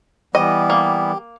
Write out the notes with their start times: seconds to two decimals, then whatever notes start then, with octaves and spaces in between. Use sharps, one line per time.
0.35 E3 G3 B3 G4 D#5
0.70 A#3